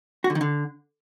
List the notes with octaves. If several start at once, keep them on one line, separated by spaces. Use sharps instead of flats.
F#4
D3
D#3
D3